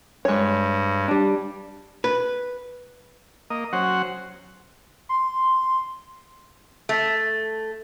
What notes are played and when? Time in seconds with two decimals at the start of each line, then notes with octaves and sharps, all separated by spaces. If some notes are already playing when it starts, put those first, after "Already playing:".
0.25 G2 G#3 C#5
1.08 G3 D4
2.04 B4
3.50 A#3 D#5
3.73 F#3 C#4 C5 F#5
5.09 C6
6.89 A3